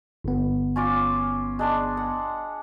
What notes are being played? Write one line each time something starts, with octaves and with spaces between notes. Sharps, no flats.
G1 B3
C#4 F4 D6
G#3 D4 C6
F#5